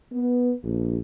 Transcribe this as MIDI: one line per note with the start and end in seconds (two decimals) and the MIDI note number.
0.13 0.53 59
0.64 0.99 34